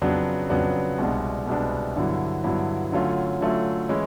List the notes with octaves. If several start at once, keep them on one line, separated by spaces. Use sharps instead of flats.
F2 C#3 F#3 B3 D4
F2 C#3 F#3 B3 D4
C2 B2 G#3 B3 D4
C2 B2 G#3 B3 D4
G2 D3 F#3 B3 E4
G2 D3 F#3 B3 E4
D3 F#3 A3 C#4 F4
D3 F#3 A3 C#4 F4
E3 G#3 C#4 E4